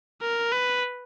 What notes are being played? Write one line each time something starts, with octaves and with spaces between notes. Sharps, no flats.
A#4
B4